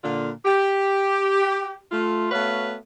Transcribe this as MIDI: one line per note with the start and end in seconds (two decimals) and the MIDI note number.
0.03 0.30 46
0.03 0.30 50
0.03 0.30 65
0.45 1.79 67
1.91 2.28 57
1.91 2.28 65
2.31 2.75 57
2.31 2.75 59
2.31 2.75 66
2.31 2.75 71
2.31 2.75 73
2.31 2.75 77